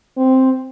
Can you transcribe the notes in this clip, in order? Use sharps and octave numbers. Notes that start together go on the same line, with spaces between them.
C4